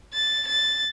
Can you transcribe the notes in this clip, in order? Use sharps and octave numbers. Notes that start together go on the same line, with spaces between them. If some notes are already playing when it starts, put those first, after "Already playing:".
A6
A6